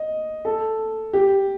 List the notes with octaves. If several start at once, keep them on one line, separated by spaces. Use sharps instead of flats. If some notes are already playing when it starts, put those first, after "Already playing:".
Already playing: D#5
A4
G4